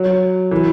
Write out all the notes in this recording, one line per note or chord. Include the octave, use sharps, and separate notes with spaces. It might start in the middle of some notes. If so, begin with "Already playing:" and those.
Already playing: F#3
E3